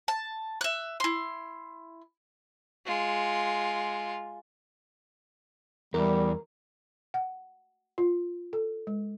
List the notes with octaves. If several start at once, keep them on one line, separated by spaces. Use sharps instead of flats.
A5
E5 F#6
E4 C6
G#3 F4
E2 G3 A#4
F#5
F4
A4
G#3